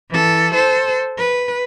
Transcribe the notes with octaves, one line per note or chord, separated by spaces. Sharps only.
E3 A4
A4 C5
B4